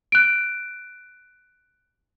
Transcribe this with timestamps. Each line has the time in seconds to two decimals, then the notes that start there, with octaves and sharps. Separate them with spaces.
0.12 F#6 D7